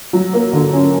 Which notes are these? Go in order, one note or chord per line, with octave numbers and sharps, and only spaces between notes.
F#3
A#3
D3
C#4